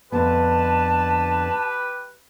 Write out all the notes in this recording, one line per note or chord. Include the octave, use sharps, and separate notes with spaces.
F2 D3 B3 G4 B4 A5